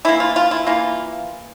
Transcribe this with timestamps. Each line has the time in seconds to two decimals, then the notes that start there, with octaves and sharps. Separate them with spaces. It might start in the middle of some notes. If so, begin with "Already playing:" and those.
0.05 E3 A#3 E4
0.20 F4
0.36 F4
0.51 E4
0.67 E3 A#3 F4